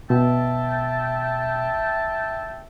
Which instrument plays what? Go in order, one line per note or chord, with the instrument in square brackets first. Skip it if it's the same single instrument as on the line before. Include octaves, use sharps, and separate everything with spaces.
[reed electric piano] B2 [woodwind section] E5 G5 A5